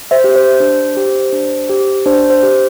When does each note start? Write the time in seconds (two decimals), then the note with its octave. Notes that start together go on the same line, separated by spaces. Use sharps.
0.11 C5 E5
0.24 G4
0.36 C5
0.60 D4
0.97 G4
1.33 D4
1.69 G4
2.06 D4 C5
2.30 C5
2.43 G4